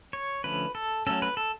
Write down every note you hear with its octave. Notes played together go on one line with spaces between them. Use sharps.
C#5
D3 F3 A3 C#4 B4
A4
F#3 A3 C#4 A4
B4
A4